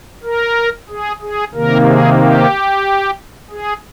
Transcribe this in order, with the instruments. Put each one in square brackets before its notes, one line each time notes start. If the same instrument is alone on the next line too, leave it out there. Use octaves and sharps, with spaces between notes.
[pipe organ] A#4
G#4
G#4
C3 D#3 A#3 A#4
G#4
G4
G#4